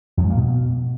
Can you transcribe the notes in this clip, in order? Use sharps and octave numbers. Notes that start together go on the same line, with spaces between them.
F2
G#2
A#3
B2